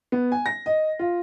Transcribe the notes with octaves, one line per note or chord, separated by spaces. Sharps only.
B3
G#5
A#6
D#5
F4